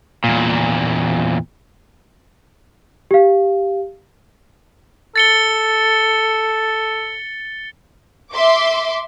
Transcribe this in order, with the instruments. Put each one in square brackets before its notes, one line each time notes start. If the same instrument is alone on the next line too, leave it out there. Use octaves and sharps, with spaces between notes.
[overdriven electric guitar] E2 A#2
[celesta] G4 F5
[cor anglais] A4 [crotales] A6 C#7 G7
[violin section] E5 C6 D6